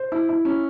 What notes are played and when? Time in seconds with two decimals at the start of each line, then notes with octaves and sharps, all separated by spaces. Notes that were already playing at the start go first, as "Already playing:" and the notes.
Already playing: C5
0.12 E4
0.29 E4
0.45 C#4